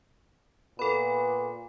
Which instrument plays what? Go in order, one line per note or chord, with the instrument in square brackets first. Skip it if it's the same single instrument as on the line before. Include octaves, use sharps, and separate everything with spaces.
[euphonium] A#2 [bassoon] B3 [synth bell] A4 B5